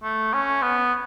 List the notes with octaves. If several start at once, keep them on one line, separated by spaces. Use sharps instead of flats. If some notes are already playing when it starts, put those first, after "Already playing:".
A3
C#4
B3